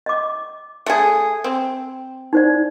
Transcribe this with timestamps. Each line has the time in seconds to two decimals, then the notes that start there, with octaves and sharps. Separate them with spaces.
0.06 D#5 D6
0.86 A3 G#4
1.44 C4
2.33 D#4 C5 D5